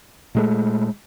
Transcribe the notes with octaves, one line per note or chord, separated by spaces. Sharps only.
A#2 G#3 A3